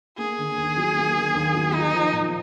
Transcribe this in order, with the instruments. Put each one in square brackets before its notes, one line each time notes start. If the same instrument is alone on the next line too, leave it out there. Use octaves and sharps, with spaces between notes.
[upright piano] A#3 [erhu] G#4
[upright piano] D3
D#2
F#3
A#3
D3
D#2
F#3
[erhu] D#4 [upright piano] F4
[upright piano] F3
A#2